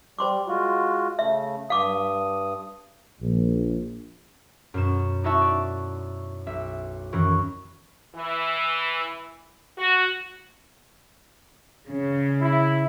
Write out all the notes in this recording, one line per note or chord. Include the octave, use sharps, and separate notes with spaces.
G3 C5 C6 D6
G#3 F4 F#4
C#3 A3 E5
G2 F5 D6 D#6
A#1
F#2 B2 E7
D#4 E4 F#4 E5 A5 C#6
D5
B1 E5
F#2 D#3 E3 F#4
E3
F#4
C#3
E4